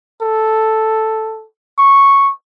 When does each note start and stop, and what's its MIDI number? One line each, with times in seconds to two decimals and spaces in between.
0.22 1.46 69
1.78 2.32 85